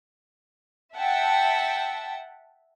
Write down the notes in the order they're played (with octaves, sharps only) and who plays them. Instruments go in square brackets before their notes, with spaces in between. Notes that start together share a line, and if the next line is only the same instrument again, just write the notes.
[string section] E5 F#5 G5 A5